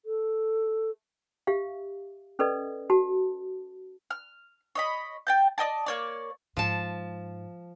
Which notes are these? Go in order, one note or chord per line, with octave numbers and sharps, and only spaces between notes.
A4
G4 E5 F5
C#4 A4 B4 D5 D#5
F#4 A5
F6
C#5 D#5 B5
G5 A5 G6
D5 D#5 G5 A5
A#3 C#5 D5
G#2 F3 A5